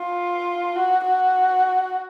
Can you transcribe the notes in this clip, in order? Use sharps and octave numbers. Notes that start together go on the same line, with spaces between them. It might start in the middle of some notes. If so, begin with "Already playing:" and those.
Already playing: F4
F#4
F#4